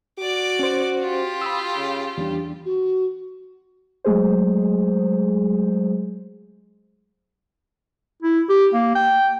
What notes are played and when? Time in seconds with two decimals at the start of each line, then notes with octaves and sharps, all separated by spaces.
0.19 F#4 D5 D6
0.59 C#4 C5
1.01 F4 G4
1.42 B5 D#6 E6
1.76 C#3
2.18 E2 G3 D4
2.64 F#4
4.04 F#3 G#3 A3 G#4 C5
8.22 E4
8.49 G4
8.73 A#3
8.95 G5